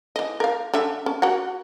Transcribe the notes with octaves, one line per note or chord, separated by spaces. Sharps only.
E3 D#5
A#4 F5
D3 C#4 E5
C#4
F#4 A#4 F#5